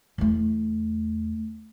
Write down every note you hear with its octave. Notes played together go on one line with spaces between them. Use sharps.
E2 A3